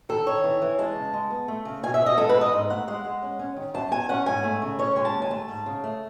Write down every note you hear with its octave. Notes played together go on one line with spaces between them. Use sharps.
D#3 A4
D#3 C#5
E3
E3
G#3 A5
C#3
G#3
B3
A3
C#3
B2 G#5
E5
B3
D#5
G#3 A4
B4
E2
D#5
G#2
A3 F#5
G#3 F#5
G#3
C#4
C#4
D#3
F#2 A5
E2 G#5
C#4 F#5
G#2 G#5
A3
C#3
C#4 C#5
G#3 G#5
A5
D#2
G#5
A3 A5
G#2
C#3
A3